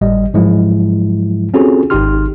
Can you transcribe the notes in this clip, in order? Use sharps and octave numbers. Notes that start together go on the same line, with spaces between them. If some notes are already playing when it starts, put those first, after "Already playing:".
G#1 A2 G3 D#5
G#2 F3 F#3 G#3 E4
C4 C#4 F4 F#4 G#4 A4
G#1 D#4 G4 C6 F6